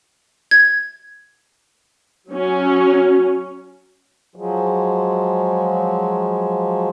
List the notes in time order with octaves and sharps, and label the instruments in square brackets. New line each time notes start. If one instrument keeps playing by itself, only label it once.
[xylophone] G#6
[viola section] F#3 C#4
[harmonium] F3 F#3 G#3